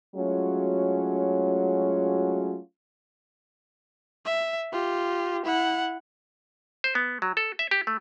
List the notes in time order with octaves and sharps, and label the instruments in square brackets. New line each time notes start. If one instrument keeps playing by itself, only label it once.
[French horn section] F#3 G#3 A3 C#4 F4 F#4
[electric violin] E5
F4 G4
E4 F#5
[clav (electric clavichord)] C5
B3
F#3
A4
E5
G4
A3